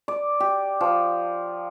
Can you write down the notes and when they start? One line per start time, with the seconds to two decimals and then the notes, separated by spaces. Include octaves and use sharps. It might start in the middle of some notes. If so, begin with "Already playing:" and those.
0.08 D5
0.40 G4
0.81 F3